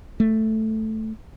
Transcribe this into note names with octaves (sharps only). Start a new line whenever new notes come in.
A3